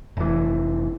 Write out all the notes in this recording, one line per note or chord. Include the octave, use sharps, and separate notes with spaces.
F1 E3